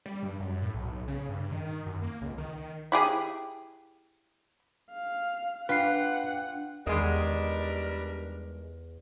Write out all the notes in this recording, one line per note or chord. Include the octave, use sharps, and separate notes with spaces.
G3
G2
F#2
A2
B1
C#3
G2
D#3
F#2
A#3
C#2
D#3
E4 G4 G#4
F5
D4 F4 B4 F#5 G5 C7
E2 D#3 G3 G#3 D4 A#4 D#5